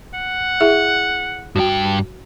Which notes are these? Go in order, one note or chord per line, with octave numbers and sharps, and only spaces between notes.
F#5
E4 G#4 E5
G2 F#4 G5